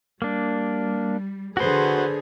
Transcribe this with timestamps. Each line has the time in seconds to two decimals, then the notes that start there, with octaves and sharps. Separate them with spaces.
0.22 G3 A#3 D4
1.57 D3 F#4 G#4 B4 C5 C6